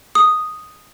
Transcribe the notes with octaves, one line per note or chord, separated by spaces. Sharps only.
D#6